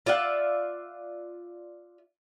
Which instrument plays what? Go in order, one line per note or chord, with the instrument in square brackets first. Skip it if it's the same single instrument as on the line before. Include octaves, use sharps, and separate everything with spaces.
[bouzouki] F4 D5 E5 F#5